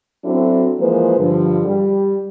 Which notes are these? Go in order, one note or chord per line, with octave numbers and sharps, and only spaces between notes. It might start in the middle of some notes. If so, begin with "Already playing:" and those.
F#3 C4 D4 E4 F#4 A4
E3 F3 G#3 A#3 B4 C5
G2 D3 F3
G3